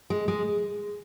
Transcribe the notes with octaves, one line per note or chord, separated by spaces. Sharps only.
G#3
G#3